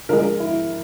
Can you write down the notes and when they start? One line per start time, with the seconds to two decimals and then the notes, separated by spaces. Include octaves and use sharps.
0.09 D3 F3 G#3 A#4
0.40 E4